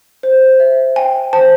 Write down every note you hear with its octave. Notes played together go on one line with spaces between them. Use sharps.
C5
E5
G5 G#5
C5 A5